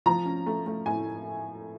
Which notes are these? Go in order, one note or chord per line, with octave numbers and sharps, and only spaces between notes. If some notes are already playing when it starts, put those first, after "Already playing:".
F3 A#5
C#4
A3
A3
A2 G#5